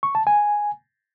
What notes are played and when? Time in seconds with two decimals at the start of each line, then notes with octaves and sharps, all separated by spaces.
0.03 C#6
0.15 A5
0.27 G#5